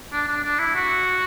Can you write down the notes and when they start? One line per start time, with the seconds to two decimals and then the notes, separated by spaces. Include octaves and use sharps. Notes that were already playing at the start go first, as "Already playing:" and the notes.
0.13 D4
0.28 D4
0.43 D4
0.59 E4
0.75 F#4